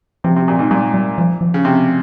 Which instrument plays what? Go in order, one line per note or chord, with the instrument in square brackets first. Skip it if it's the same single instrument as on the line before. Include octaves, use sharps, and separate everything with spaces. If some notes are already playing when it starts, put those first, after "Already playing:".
[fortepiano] C3 [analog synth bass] F3
[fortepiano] C3
A#2
G#2
[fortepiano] A#2 [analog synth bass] G3
[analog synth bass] G3
F3
F3
[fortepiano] C#3
C3